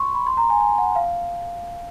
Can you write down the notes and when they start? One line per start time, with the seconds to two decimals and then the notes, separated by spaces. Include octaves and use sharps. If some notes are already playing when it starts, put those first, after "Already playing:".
Already playing: C6 C#6
0.15 B5
0.27 C6
0.37 A#5
0.50 G#5
0.61 G#5
0.78 F#5
0.95 F5